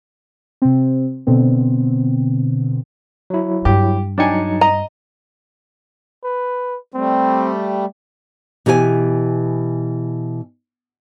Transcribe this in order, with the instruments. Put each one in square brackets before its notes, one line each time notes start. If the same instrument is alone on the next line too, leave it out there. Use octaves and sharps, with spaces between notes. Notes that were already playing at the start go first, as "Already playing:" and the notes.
[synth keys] C3 C4
B2 D3 B3 C4
[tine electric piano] F#3 E4
[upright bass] G2 [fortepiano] G4
[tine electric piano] F#3 D#4 C#7 [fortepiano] D4 G5 G#5
[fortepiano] D#5 [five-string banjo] A#5
[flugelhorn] B4
[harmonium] G3 A3 [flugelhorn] C4
[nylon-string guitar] B2 E3 G4 C5 G#5